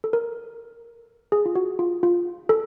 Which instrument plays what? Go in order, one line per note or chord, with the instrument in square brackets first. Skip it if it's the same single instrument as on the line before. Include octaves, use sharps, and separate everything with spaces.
[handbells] A4
A#4
G#4
F4
F#4
F4
F4
A4